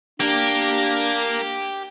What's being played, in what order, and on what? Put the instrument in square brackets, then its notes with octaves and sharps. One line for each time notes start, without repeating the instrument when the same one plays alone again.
[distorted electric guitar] A#3 [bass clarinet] D4 [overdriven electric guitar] G4